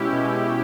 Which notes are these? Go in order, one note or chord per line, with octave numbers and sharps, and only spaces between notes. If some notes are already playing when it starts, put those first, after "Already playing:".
Already playing: B2 G#3 C#4 E4 G4
B2